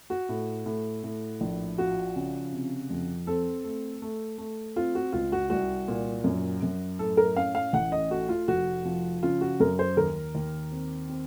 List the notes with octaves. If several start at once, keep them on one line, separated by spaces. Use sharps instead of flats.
F#4
A2
A2
A2
A#1
F3 F#4
C#3
C3
F2
C4 A4
A3
A3
A3
C4 F4
F#4
C#2 F4
F#4
C2 F#4
A#2
F#2
F#2
A2 A4
A#4
C#4 F5
F5
A1 F#5
D#5
A3 F#4
F4
F1 F#4
F3
C#3 F4
F#4
F#2 A#4
C5
D#2 A#4
D#2
C4
C4